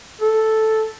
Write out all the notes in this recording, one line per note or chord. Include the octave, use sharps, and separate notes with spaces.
A4